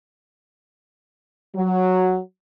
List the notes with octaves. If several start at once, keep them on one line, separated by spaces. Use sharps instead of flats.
F#3